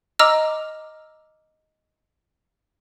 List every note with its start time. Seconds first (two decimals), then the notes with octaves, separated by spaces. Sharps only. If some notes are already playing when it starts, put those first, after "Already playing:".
0.19 D#5 A#5 D6 E6 F6